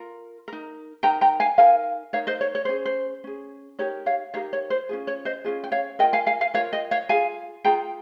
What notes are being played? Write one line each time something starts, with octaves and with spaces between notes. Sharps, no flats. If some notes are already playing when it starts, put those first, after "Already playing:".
Already playing: F4 A#4
D#4 A#4
D#4 A#4 G5 A#5
G5 A#5
F5 G#5
D#4 A#4 F5 G#5
D#4 A#4 C#5 F5
C5 D#5
C#5
C#5
C#4 G#4 C5
C5
C#4 G#4
D#4 G4 A#4 C#5
C#5 F5
D#4 G4 A#4 C#5 F5
C#5
C5
C#4 F4 G#4
C#5
C5 D#5
C#4 F4 G#4
G5
C#5 F5
F4 A#4 D#5 G5
F5 G#5
F5 G#5
F5 G#5
F4 A#4 C#5 F5
D#5 G5
C#5 F5
F4 G#4 F5 G#5
F4 G#4 G5 A#5